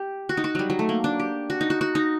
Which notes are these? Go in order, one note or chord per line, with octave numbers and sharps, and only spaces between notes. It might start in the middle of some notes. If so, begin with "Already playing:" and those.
Already playing: G4
F#4
D#4
F#4
F#3 G3
F#3
A3
A#3
D4
G4
F#4
D#4
F#4
F#4
D#4